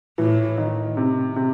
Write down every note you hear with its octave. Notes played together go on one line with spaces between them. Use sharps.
A2 E3
D#3
C3
C3